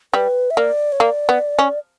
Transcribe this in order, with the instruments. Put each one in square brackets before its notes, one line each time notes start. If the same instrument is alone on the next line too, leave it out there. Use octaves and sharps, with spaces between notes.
[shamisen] G3 [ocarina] B4
[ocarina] E5
[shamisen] A#3 [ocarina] D5
[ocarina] C#5
[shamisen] A#3 [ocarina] D5
[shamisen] B3
C#4